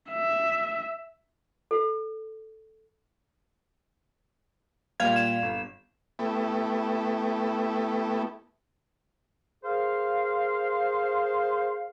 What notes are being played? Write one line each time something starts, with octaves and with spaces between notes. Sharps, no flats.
E5
A4
A#2 G3 F5 G#6
E7
G1
A3 B3 E4 G4
G#4 A#4 C5 F5